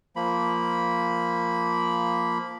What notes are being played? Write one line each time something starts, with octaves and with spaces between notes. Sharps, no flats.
F3 A#3 B5